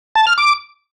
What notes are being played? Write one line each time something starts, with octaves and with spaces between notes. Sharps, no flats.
A5
F6
D6